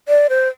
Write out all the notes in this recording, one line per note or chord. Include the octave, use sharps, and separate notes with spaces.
D5
C5